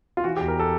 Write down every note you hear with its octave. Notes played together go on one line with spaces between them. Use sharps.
F4
E3 F#4
G4
E2
A#4
A4